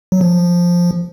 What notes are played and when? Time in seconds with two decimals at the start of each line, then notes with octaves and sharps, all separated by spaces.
0.12 F#3
0.21 F3